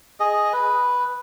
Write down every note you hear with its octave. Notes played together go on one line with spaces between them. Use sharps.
G#4 D#5
B4